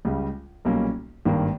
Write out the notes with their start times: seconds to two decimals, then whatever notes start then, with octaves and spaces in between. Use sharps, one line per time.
0.05 C#2 C#3 G3
0.65 B1 A#2 G3 A#3 C#4
1.25 G#1 G2 D#3 A#3